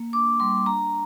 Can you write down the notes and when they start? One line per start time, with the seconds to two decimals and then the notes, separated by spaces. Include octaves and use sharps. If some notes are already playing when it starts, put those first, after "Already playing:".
Already playing: A#3
0.13 D4 D6
0.40 G3 C6
0.66 D4 A#5